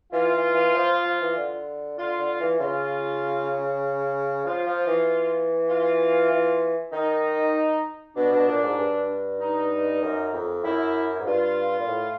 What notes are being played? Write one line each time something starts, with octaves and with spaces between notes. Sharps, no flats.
E3 F4
E3
E3
F3
F3
E3
D3
D3 F4
D3
E3
C#3 F4
F3 F4
F3
E3
F4
E3
D#3 D#4
B2 D4
B2
A#2
G#2
G2
D#4
F#2
F2
F#2 E4
G#2
G2 F4
A#2
A2